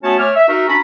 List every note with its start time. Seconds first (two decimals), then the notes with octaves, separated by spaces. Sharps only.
0.04 A3 B3 C#4 F#4 C#5 A5
0.19 A3 C#5 G#5 D6 F6
0.36 E5
0.49 D#4 F#4 A#4 E5
0.68 C#4 D4 F#4 A#5 B5